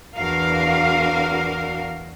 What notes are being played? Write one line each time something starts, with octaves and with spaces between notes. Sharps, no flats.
E2 D4 F#4 A#4 F5